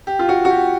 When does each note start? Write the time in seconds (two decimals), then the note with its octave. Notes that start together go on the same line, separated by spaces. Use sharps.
0.07 G4
0.19 F4
0.29 F#4
0.45 F#4
0.50 G4